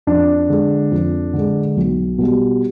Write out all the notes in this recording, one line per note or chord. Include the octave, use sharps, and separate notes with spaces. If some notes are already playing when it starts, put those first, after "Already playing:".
F2 D4
D3 G#3
F2
D3 G#3
B1
B2 G3